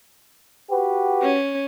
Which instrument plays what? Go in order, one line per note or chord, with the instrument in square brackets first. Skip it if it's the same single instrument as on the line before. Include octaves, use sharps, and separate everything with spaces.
[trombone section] F#4 G4 B4
[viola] C#4